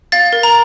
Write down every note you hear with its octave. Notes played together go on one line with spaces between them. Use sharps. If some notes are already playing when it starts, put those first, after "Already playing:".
F5 A6
A#4
A#5